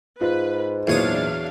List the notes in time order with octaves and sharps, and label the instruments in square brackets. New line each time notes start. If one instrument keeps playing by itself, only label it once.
[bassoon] G#2 [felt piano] F4 [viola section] B4
[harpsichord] E2 C#5 D#6 [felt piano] A#2 E3 [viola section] F#3 D4 F5